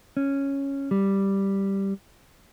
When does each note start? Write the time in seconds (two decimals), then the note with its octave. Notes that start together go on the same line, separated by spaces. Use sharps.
0.17 C#4
0.91 G3